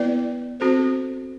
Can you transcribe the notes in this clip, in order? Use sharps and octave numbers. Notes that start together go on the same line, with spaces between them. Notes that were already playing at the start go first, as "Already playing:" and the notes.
Already playing: B3 E4 B4 D5
C4 F#4 A4 C5